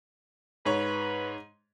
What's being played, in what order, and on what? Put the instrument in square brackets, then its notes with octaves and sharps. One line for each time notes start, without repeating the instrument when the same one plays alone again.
[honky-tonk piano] G#2 C#5 [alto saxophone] B4